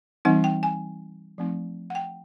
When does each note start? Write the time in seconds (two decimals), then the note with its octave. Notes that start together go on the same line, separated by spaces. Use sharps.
0.25 E3 G3 C4 D#4 F#5
0.44 G5
0.63 G#5
1.38 F3 A3 C4 D#4
1.90 F#5
1.95 G5